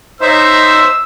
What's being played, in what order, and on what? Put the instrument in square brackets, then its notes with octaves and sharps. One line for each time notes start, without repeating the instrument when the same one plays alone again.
[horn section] D#4 C#5 E5 [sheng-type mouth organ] C5 [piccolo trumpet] E6